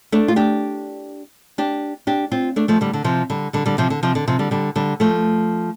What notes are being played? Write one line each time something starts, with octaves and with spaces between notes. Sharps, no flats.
A3 D4
F4
D4 G4
D4 G4
D4 G4
C4 F4
A3 D4
F3 A3
D3 G3
D3
C3 F3
D3 G3
D3 G3
D3 G3
C3 F3
D3
C3 F3
D3
C3 F3
D3 G3
D3 G3
D3 G3
F3 A3